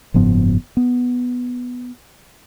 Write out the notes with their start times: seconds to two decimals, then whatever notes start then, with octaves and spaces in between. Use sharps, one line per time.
0.14 F#1 G#2 F3 B3
0.77 B3